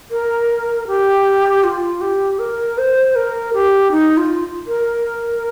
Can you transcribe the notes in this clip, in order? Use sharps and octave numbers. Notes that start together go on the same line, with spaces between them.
A#4
G4
F4
G4
A#4
C5
A#4
G4
D#4
F4
A#4